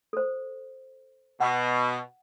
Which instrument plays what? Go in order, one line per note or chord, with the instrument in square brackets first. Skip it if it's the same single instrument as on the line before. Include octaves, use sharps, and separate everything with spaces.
[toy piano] A4 C5
[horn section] B2 [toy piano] F#5